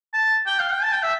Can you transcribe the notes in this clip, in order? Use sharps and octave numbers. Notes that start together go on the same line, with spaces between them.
A5
G5
F5
G5
A5
G5
E5